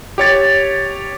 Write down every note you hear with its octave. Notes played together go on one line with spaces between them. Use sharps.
G4 C#5 A6